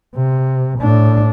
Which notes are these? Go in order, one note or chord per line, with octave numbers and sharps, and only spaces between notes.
C3
A2 D4